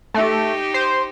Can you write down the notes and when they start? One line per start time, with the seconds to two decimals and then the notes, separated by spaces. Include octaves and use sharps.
0.14 A3 D#4 G4
0.74 C5